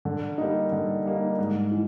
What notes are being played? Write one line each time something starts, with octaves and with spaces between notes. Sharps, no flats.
D3
G3 A#3 D#4
D3
G3 A#3 D#4
G#2
E3